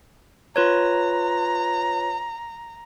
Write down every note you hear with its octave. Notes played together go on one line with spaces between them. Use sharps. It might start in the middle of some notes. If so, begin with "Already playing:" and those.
F4 B4 C#5 A#5